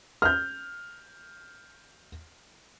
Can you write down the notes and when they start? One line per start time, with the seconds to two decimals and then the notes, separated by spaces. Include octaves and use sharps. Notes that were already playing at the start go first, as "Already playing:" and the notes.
0.22 F6 G6